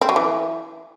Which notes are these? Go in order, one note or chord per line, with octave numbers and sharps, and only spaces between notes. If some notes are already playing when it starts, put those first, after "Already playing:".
C4
F#3
E3